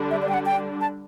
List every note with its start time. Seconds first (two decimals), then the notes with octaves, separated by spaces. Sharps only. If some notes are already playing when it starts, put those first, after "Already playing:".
Already playing: D3 G3 D4
0.11 E5
0.22 D5
0.29 G5
0.34 F#5
0.46 G5
0.81 A5